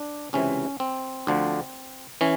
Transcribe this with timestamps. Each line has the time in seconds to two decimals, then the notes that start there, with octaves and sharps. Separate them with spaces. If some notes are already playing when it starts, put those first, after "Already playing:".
Already playing: D4
0.33 C#2 C3 E3 C#4
0.80 C4
1.27 D2 D3 F3
2.21 E3 C#4